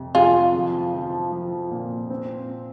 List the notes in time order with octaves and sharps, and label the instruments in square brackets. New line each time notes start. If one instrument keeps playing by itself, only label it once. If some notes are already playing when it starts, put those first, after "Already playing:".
Already playing: [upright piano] F2 C3
[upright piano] F2 [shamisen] F4 G#4
[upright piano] F3
F3
F3
A#2
C4